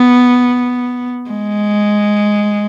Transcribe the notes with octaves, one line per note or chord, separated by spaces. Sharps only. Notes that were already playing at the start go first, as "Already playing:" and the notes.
Already playing: B3
G#3